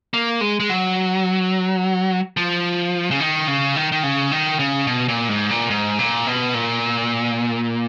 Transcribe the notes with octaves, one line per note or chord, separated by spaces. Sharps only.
A#3
G#3
G#3
F#3
F3
C#3
D#3
C#3
D#3
D#3
C#3
D#3
C#3
B2
A#2
G#2
A#2
G#2
A#2
B2
A#2